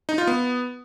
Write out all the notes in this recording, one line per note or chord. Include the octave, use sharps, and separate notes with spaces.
D#4
F4
B3